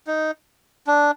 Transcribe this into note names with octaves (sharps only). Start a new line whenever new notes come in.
D#4
D4